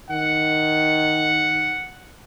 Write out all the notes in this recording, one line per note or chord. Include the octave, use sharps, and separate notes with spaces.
D#3 F#5